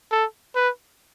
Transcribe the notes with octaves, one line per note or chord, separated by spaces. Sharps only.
A4
B4